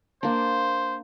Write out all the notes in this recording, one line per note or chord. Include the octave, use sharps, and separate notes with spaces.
A#3 D4 C5